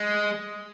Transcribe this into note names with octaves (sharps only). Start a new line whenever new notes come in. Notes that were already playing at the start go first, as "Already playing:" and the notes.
Already playing: G#3